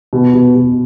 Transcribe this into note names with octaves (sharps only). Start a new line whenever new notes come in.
B2
B2
B2